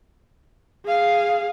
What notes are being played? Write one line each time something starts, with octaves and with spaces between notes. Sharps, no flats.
G#4 F5